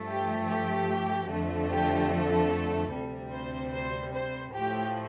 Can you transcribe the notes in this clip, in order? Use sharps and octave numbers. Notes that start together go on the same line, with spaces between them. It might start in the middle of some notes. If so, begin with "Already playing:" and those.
Already playing: G2 F3 A3
G4
G4
F2 D3 F3 A3
G4
A4
D2 C3 G3
C5
C5
C5
A2 F3 A3 G4